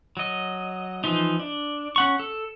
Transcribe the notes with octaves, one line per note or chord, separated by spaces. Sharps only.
F#3 D#5
E3 F3 D#4
D4
C#4 F#5 C#6
A4